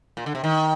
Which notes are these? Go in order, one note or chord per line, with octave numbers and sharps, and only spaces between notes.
A#2
D3
C3
D#3